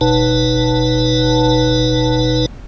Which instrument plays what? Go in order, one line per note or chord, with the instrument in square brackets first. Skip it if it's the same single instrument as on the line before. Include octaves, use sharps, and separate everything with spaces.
[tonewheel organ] F#1 B2 D#4 B4 A5